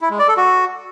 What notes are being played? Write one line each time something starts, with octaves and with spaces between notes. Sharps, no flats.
E4
G#3
D5
A4
F#4